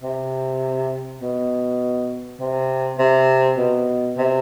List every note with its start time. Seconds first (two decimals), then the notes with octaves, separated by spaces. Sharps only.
0.03 C3
1.21 B2
2.40 C3
2.99 C3
3.58 B2
4.18 C3